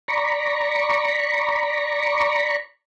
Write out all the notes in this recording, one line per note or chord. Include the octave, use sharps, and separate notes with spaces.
D5 A#5 B5 C#6